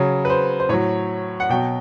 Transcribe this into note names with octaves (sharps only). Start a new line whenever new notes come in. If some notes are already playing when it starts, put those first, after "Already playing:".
Already playing: C#3 F#3
B4
C5
C5
A2 F#3 C#5
F#5
B2 F#3 G5